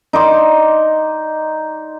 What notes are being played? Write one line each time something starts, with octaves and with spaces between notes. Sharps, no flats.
D#4 D5 C6